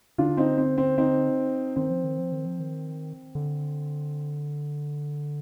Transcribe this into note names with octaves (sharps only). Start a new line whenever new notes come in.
D3 D4 F4
C4 D#4
C4
C4
C4 D#4
D#3 C4
F3
D#3
F3
D#3
F3
D#3
D3